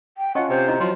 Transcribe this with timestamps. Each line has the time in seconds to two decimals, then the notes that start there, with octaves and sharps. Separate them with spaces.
0.18 G5
0.35 C#4 F4 D#5 F#5 A5 C#6
0.50 C3 C5
0.68 E4 D#5 A#5
0.80 F3 F#3 C6